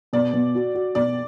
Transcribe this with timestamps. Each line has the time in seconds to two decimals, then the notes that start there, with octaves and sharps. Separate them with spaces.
0.13 B2 D5
0.33 B2
0.55 F#4
0.75 F#4
0.95 B2 D5